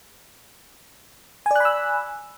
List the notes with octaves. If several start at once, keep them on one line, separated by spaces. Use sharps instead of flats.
D5 G#5 B5 E6 F#6